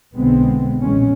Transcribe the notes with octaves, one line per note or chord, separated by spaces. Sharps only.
B1 D3 G#3 B3 C4
A#1 E2 G#3 C#4